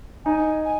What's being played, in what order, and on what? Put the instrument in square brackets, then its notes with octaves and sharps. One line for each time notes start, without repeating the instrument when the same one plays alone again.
[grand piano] D#4 [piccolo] G#5
[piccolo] G#5